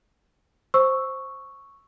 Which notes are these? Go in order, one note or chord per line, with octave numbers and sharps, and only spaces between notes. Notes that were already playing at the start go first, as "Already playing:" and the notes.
C5 C#6 E6